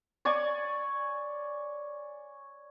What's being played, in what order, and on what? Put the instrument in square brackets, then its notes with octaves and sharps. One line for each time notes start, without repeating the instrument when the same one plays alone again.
[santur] C#5 D5 G#5 C#6